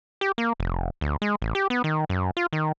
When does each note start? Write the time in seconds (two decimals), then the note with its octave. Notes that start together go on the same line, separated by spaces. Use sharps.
0.21 G4
0.38 A#3
0.60 F1
1.01 D2
1.22 G#3
1.42 A1
1.55 G4
1.70 B3
1.84 D#3
2.09 F#2
2.37 F4
2.53 D#3